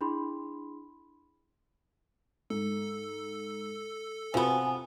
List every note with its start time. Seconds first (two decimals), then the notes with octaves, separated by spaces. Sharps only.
0.01 D4 E4 G#4 B5 C6
2.50 G#2 A4
4.34 C3 F3 B3 F4 F#4 G#5